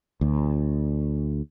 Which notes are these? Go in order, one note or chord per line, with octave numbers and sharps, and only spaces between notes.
D2